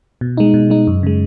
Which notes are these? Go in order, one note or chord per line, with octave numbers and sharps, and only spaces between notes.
B2
G#3 D#4
B2
G#3 D#4
F#2
C#3 G#3